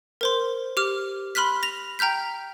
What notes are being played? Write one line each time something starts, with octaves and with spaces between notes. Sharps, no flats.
A#4 C5 C6
G4 D6 F6
B5 C6 F6 F#6 B6
A#6 F7
G5 A#5 F6 G6 B6